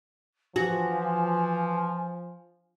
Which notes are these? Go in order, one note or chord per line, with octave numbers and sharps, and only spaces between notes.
E3 F3 F#4 G#5